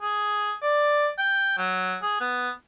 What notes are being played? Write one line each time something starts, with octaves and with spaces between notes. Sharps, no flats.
G#4
D5
G5
F#3
G#4
B3